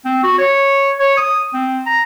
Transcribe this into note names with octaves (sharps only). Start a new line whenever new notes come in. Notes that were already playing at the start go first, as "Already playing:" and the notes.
C4
F#4
C#5
C#5
D#6
C4
A#5